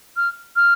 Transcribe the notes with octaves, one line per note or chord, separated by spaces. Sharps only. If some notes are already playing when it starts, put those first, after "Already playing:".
F6
F6